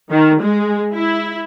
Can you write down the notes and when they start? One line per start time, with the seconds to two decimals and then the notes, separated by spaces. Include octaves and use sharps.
0.11 D#3
0.41 G#3
0.94 E4